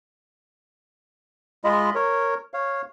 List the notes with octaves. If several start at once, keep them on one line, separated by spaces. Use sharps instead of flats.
G#3 F4 D#5 B5
A#4 C#5
C#5 F5